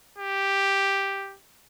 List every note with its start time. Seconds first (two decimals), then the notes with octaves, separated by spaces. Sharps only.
0.18 G4